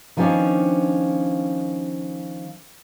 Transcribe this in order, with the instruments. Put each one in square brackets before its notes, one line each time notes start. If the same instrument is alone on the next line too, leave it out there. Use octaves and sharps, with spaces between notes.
[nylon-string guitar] D#3 F3 A#3 B3 C#4 D4